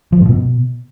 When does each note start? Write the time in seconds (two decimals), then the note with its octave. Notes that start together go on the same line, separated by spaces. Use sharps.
0.12 F3
0.21 G#2
0.29 B2